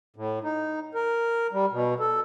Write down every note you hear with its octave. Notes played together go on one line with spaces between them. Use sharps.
A2
D#4
A#4
G3
B2
A4